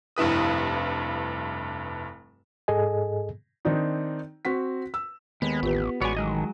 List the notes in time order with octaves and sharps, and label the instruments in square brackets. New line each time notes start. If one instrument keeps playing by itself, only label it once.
[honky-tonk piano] F1 G2 E4 B4 D#6
[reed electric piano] G#2 G#4 A4 D#5 G#5
[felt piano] D#3 C4 D4 D#4
C4 F#4 B6
E6
[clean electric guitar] D#2 [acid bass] G#3 [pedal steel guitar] B3
[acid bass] A1 [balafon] F4 G4 B4
[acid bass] A1 [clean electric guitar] G#3 B3 [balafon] F#4 [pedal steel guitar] C#5 D5 G#5
[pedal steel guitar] D#3 [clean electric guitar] F#3 G#3 D#5